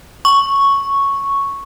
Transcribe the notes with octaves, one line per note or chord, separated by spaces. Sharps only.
C#6